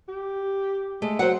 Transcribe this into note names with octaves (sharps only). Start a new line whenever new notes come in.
G4
G#3 A3
F#3 C5 F#5